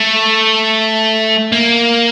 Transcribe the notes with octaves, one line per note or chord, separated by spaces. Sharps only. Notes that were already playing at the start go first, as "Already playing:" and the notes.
Already playing: A3
A#3